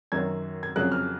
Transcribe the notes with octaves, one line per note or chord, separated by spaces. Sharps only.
F#2 D#3 F#3 G#6
G#6
F2 C#3 F#3 F#6
F6